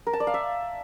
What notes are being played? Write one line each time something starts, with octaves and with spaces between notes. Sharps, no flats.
A#4
A5
D5
F5
E5